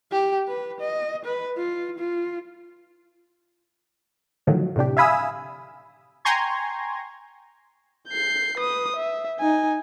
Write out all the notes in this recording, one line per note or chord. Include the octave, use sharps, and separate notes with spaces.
G4
B4
D#5
B4
F4
F4
A2 D3 D#3 F3 F#3
A2 C3 D4 G4
E5 F5 G#5 B5 D#6 E6
G5 G#5 A#5 C6 C#6 G#6
G6 C7
B4 D#6
E5
D#4 G#5